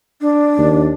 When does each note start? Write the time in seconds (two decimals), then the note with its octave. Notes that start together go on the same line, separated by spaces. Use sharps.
0.21 D4
0.58 D#2